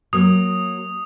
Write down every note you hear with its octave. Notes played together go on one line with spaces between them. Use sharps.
F#3 A#3 D#6